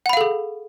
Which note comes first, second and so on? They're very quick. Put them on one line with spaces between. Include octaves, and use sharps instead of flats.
F#5 B5 F5 A4 G#4